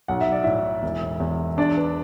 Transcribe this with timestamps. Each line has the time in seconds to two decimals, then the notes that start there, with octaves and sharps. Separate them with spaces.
0.08 B1 F#5
0.21 E5
0.32 D5
0.44 A2 E4 E5
0.83 E1
1.20 E2
1.57 E2 D4 D5
1.77 B4